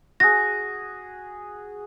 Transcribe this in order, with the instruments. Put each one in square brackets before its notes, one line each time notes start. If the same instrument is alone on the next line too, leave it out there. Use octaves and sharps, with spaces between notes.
[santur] F#4 G#4 [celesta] A#6